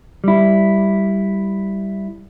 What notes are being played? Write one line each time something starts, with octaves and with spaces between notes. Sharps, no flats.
G3 E4